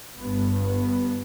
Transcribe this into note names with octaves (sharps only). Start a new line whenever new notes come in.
G1 G2 B3
B3